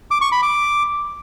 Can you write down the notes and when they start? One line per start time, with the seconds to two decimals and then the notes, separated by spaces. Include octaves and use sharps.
0.11 D6
0.21 C#6
0.32 B5
0.43 D6